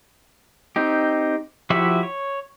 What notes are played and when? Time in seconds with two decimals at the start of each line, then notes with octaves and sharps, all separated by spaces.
0.76 C4 D#4 G4
1.70 F3 E4 F#4 G4 E5
2.03 C#5